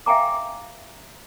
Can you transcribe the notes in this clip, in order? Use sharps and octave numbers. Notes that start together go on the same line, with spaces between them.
E5 F5 G5 G#5 A#5 D6